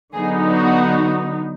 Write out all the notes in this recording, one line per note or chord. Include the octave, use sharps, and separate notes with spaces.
D3 F#3 B3 D#4 G#4
F#4